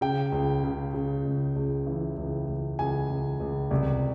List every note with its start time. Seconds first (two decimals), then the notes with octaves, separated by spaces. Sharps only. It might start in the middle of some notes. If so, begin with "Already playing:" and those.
0.01 C#3 G5
0.32 C#2
0.64 C#3
0.94 C#3
1.25 C#2
1.56 C#2
1.87 E3
2.17 C#2
2.47 C#2
2.79 C#2 G#5
3.10 C#2
3.40 C#2
3.71 C2